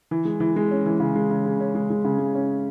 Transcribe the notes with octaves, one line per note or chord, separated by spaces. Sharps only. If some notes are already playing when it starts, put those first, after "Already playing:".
E3
G#3
E3
G#3
C#4
E3
C#3
G#3
C#3
C#3
C#4
G#3
G#3
C#3
G#3
C#4